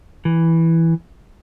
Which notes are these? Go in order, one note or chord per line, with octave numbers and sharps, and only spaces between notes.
E3